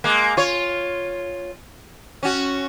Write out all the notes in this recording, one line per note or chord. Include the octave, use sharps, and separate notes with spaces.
G#3 A#3
F4 C#5
C#4 F#4